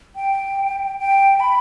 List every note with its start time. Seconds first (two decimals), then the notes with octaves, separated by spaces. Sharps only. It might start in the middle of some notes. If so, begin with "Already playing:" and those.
0.16 G5
0.98 G5
1.40 B5